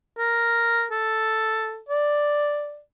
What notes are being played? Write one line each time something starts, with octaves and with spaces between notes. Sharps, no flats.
A#4
A4
D5